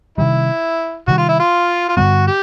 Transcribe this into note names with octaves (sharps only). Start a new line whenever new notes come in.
C3 D#3 G3 E4
C3 D#3 G3 F#4
F4
E4
F4
F4
G2 D3 G3 B3 F#4
G4